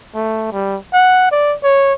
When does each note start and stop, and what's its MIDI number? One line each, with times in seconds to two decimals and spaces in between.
0.14 0.48 57
0.52 0.77 55
0.93 1.28 78
1.31 1.55 74
1.64 1.94 73